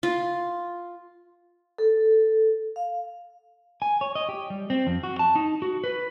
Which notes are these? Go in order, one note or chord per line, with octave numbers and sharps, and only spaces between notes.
F4
A4
F5
G#5
C#5
D#5
G4
G3
C4
F2
F#4
A5
D#4
F#4
B4